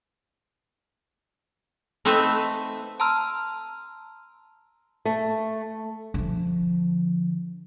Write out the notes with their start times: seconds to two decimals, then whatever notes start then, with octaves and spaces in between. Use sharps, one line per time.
2.05 A3 C4 D#4 B4 E5
3.00 A5 A#5 C6 E6 F6
5.05 A3
6.14 D3 F3